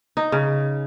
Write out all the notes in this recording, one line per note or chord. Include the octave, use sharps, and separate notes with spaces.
D#4
C#3